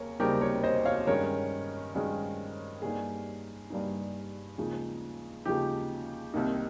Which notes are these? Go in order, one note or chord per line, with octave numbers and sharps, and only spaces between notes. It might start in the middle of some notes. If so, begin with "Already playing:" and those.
Already playing: D#2 C#3 A#4 C#5
D#2 C#3 G3 C4 D#4 G4 A#4
A#4 C#5
C5 D#5
C#5 F5
G2 D#3 G#3 C#4 A#4 C#5
G2 D#3 G#3 C#4
G2 G3 A#3 D#4 G#4
G2 G3 A#3 D#4
D#2 C#3 F3 G#3 D#4
D#2 C#3 F3 G#3 D#4 G4
C2 C3 D#3 A#3 D#4